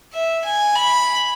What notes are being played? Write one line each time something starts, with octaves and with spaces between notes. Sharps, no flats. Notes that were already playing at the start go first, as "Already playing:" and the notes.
E5
G#5
B5